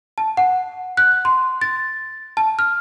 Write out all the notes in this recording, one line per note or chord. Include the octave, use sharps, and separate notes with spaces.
A5
F#5
F#6
C6
A6
A5
F6